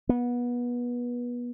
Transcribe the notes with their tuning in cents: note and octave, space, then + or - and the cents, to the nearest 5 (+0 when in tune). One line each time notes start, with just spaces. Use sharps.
B3 -25